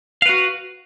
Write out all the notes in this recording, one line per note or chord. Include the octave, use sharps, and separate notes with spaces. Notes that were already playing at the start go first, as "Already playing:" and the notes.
F#4 B4 F5